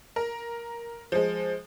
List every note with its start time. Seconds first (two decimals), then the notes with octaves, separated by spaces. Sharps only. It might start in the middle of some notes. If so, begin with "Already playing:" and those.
0.16 A#4
1.12 F3 G#3